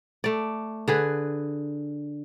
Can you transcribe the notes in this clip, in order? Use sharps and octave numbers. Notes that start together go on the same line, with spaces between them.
A3 D5
D3 G#4 B4